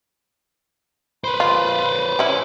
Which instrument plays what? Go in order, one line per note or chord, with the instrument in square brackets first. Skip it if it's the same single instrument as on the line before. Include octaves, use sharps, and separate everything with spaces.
[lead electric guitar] B4 C5 [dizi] B5
[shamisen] F4
C#4 E4